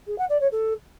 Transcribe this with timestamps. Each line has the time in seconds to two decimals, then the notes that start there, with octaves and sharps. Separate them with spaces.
0.07 G#4
0.18 F#5
0.29 D5
0.41 C#5
0.52 A4